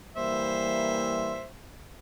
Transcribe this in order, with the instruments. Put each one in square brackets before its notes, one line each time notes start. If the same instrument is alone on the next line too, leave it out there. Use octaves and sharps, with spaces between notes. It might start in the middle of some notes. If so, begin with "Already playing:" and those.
[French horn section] E3 G3 A#3 [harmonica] C5 E5